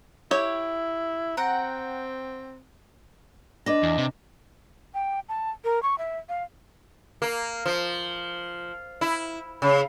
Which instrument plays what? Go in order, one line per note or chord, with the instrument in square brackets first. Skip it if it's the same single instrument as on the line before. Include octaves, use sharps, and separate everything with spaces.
[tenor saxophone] E4 [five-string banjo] G4 C#5
[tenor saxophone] C4 [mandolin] F#5 G5 A#5
[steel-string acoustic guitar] D4 B4 [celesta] D#5 D6 A#6
[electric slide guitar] E2
C3
[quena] G5
A5
A#4
C#6
E5
F5
[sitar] A#3
F3
E4
C#3